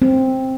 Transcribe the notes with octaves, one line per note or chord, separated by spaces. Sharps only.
C4